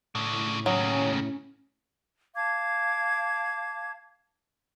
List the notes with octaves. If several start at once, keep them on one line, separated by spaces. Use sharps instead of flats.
A2 C#3 D4
D#2 C#3 F#3 C#4
F5 A5 D6 G#6